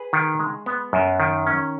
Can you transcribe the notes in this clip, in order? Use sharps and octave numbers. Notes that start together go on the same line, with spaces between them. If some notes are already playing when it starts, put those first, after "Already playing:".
Already playing: G#4 B4
D#3
G#3
B3
F#2
D#3
C#4